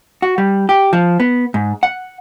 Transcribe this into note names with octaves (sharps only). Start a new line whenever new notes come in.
F#4
G3
G4
F3
B3
G#2
F#5